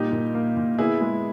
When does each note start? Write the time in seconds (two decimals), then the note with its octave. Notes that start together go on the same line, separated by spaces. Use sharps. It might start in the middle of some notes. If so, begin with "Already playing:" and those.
Already playing: A#2 G3 D#4 G4
0.12 A#2
0.35 A#3
0.57 A#2
0.79 B3 E4 G#4
1.01 G#3